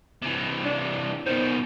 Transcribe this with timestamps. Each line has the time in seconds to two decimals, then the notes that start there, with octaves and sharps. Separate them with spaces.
0.22 C3 E3
0.65 D4
1.26 B2 D#3 C5